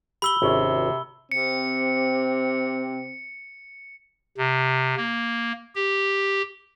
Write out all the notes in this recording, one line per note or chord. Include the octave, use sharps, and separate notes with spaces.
G4 B5 E6 G7
G#1 C3 C#4 E4
C3 C4 C#7
C3
A#3
G4